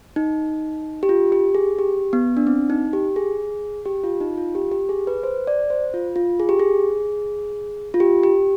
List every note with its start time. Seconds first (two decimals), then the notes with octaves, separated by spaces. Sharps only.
0.16 D#4
1.03 G4
1.09 F4
1.32 G4
1.55 G#4
1.79 G4
2.13 B3
2.37 D4
2.47 C4
2.70 D#4
2.93 G4
3.16 G#4
3.85 G4
4.04 F4
4.20 D#4
4.38 F4
4.55 G4
4.72 G4
4.89 G#4
5.07 B4
5.23 C5
5.47 D5
5.70 C5
5.94 F4
6.16 F4
6.40 G#4
6.49 G4
6.59 G#4
7.94 F4
8.00 G4
8.23 G4